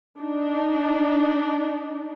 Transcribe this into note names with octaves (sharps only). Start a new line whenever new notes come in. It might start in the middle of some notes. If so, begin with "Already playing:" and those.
D4 D#4